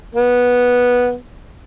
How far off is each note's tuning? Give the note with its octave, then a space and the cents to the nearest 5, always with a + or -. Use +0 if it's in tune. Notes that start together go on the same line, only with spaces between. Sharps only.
B3 -10